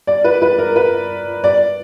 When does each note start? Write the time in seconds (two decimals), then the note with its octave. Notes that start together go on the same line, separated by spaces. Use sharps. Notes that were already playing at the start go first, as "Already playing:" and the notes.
0.07 D5
0.24 B4
0.42 B4
0.59 A#4
0.76 B4
1.44 D5